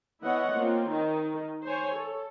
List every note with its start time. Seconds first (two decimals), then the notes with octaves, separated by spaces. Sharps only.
0.22 E3 B3 E4 C#5 D#5 F#5
0.53 A#3 C4 F4
0.91 D#3 D#4
1.65 C5 C#5 G#5
1.96 A4